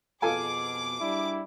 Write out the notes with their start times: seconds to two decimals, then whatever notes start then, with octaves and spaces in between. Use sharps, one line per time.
0.22 F2 B2 F4 G#4 A4 G#5 D6
1.01 G3 D4 E4